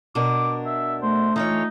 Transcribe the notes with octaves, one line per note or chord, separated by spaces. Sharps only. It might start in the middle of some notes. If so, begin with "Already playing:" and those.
B2 D4 A#4 D6
E5
A3 C5
E3 D#4 F4 C#5